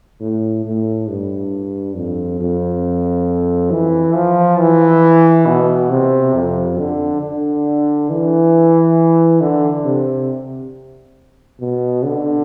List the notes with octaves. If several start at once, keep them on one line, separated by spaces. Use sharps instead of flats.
A2
A2
G2
F2
F2
E3
F3
E3
B2
C3
F2
D3
D3
E3
D3
C3
B2
D3